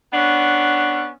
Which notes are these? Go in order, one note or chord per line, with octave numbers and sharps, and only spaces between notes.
B3 C#4 D4